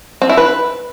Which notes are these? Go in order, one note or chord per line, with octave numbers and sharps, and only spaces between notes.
C4
E4
B4